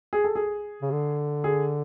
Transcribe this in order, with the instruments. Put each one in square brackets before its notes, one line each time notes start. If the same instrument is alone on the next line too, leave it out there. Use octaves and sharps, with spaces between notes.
[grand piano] G#4
A4
G#4
[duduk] C#3
D3
[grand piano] G#4